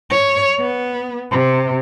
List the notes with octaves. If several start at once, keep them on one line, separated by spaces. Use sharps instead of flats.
C#5
B3
C3